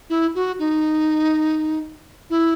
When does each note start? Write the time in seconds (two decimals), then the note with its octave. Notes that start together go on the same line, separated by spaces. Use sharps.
0.10 E4
0.35 F#4
0.59 D#4
2.30 E4